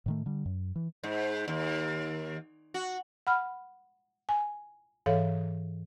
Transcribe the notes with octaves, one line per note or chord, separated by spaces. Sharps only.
A2 D#3 A3
D3 G3
F#2
E3
G#2
D#2
F#4
F#5 B5 F6
G#5
G#2 E3 A4 C#5 F5